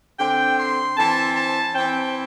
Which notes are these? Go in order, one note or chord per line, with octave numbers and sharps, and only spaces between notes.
D3 C4 G5
C6
E3 C4 A5
A5
E3 C4 G5